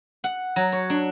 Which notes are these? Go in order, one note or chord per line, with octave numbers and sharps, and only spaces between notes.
F#5
F#3
C#5
D4